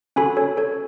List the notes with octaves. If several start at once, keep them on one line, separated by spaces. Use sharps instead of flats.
C#4 F#4 A4 G#5 B5
A4 C#5
A4 C#5